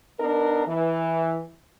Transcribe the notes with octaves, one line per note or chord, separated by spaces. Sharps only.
B3 D4 D#4 A#4
E3